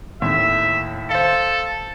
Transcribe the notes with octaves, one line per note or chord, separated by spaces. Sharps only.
D#2 A2 E5
A4 C5 F5